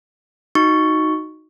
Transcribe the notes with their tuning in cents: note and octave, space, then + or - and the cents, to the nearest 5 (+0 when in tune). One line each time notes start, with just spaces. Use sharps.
D#4 +0 F#4 +0 C#6 +0